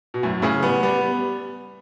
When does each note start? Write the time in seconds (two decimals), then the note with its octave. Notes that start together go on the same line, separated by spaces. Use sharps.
0.14 B2
0.23 F#2 A2
0.42 A2 C#3
0.63 G3 B3
0.83 G3 B3